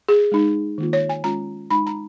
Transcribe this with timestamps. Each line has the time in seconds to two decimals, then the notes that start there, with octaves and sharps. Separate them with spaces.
0.09 G#4
0.32 G#3 D#4
0.78 D#3 A#3 F4
0.93 C#5
1.09 G#5
1.24 G#3 C#4 F4 A#5
1.71 G#3 D#4 B5
1.87 A#5